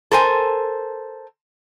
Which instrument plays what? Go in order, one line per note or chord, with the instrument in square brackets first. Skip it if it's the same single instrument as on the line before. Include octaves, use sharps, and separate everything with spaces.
[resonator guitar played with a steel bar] A4 A#4 C5 G#5